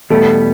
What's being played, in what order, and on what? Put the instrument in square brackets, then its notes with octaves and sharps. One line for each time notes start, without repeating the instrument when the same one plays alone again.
[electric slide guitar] E2 B2 G3 B3 [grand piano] A3